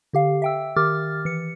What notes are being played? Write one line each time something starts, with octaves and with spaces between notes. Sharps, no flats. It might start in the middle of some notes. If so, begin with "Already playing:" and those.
D3 G4 F5
E5 G5 E6
D#3 G4 D6 F6 A6
E3 C#7